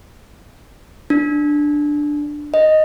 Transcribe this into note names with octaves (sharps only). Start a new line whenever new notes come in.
D4
D#5